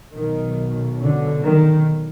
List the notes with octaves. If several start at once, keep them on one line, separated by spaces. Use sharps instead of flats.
B1 B2 D#3
D3
D#3